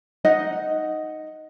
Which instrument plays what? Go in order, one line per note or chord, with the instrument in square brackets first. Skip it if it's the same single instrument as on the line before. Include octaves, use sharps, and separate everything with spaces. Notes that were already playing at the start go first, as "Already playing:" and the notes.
[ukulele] D#4 D#5 F#5